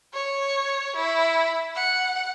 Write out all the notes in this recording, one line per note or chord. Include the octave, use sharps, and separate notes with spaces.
C#5
E4
F#5